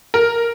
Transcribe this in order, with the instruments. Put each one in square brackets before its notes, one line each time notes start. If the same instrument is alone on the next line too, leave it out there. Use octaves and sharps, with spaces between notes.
[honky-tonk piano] A#4